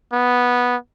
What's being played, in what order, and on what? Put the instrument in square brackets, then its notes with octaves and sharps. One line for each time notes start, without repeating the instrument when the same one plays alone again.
[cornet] B3